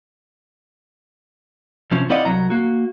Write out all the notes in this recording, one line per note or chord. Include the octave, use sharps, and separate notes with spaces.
C3 F3 C#4
C4 E4 D5 D#5 F5 F#5
C2 F#3 A#5
A#3 F#4